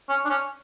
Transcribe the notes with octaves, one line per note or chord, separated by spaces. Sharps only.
C#4
D4
C#4